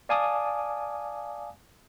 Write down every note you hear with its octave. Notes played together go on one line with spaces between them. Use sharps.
D5 F5 G#5 A5 D6 D#6